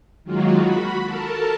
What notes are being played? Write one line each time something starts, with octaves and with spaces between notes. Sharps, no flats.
D#3 F#3 G#3 A#3 F4 F#4
F#4 B5
A4 A#4 A5